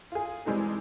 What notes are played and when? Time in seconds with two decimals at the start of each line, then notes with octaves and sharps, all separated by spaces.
0.12 F4 G#4
0.45 E3 G3 G#3 C4 D#4 A4